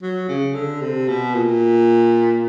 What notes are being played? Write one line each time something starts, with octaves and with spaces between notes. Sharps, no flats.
F#3
C#3
D3
C3
B2
A#2